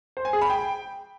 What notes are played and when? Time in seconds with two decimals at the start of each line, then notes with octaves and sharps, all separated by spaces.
0.17 C5
0.25 G#5
0.33 G#4
0.41 B5
0.50 G5